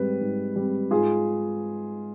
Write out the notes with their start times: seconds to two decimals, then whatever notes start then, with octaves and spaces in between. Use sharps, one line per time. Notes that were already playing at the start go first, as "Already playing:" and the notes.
Already playing: G#2 G3 C4 B4
0.20 G#2
0.56 G3 C4
0.91 G#2 F4 G#4